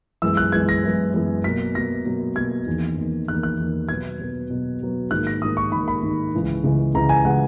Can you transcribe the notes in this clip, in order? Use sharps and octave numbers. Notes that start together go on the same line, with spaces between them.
F#2 E3 G#3 B3 E6
F#6
F#2 E3 G#3 B3 G#6
A#6
F#2 E3 G#3 B3
F#2 E3 G#3 B3
B2 F#3 A#3 B6
B2 F#3 A#3 A#6
B2 F#3 A#3
B2 F#3 A#3 G#6
E2 D#3 A#3
E2 D#3 A#3
E2 D#3 A#3 F#6
F#6
E2 D#3 A#3
B2 F#3 B3 G#6
B2 F#3 B3
B2 F#3 B3
B2 F#3 B3
G#2 D#3 A#3 F#6
A#6
G#2 D#3 A#3 D#6
C#6
G#2 D#3 A#3 B5
B5
G#2 D#3 A#3
C#2 C#3 E3 G#3
C#2 C#3 E3 G#3
C#2 C#3 E3 G#3 A#5
G#5
C#3 E3 G#3 F#5